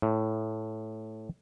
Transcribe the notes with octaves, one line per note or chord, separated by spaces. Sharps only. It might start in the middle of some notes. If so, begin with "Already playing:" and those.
A2